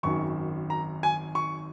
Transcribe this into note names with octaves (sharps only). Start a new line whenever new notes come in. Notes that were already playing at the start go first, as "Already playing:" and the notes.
G#1 F#2 D#3 C#6
A#5
G#5
C#6